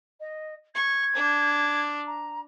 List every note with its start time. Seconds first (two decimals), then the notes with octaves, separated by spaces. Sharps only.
0.20 D#5
0.75 C#6 G#6
1.16 D4
2.07 A#5